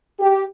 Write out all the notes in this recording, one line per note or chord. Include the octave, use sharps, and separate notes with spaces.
G4